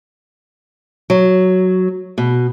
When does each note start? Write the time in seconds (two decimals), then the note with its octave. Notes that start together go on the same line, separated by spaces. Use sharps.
1.10 F#3
2.18 B2